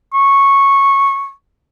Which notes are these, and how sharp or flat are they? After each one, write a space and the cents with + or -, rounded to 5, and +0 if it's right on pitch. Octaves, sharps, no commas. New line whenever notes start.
C#6 -10